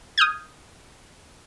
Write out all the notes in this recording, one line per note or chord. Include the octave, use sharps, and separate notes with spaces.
D#6 F6 G6 G#6